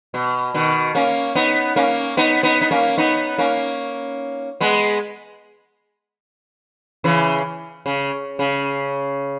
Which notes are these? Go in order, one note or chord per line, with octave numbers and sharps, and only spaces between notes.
B2
B2 D#3
A#3 C#4
B3 D#4
A#3 C#4
B3 D#4
B3 D#4
D#4
A#3 C#4
B3 D#4
A#3 C#4
G#3 B3
C#3 E3
C#3
C#3